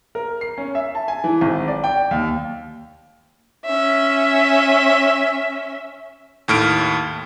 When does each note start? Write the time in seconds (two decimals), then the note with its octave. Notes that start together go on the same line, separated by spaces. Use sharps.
0.15 A#4
0.41 C7
0.58 C#4
0.75 E5
0.95 A5
1.08 G#5
1.24 E3
1.41 G#1
1.68 D5
1.84 G5
2.11 D#2
3.65 C#4 E5
6.48 D#2 A2 F6 D7